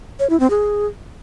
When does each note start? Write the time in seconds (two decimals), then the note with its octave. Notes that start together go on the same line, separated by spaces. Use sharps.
0.19 C#5
0.30 E4
0.40 C4
0.50 G#4